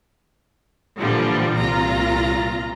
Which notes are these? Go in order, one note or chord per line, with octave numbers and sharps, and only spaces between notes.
A#2 D3 E3 F3 G3
C2 A#2 F4 A#5